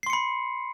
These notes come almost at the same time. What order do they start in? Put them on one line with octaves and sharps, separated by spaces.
C7 C6 C#7 B5